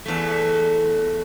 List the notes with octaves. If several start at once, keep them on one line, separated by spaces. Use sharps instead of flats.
E2 A3